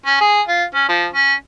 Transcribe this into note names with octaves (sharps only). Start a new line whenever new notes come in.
C#4
G#4
F4
C#4
F3
C#4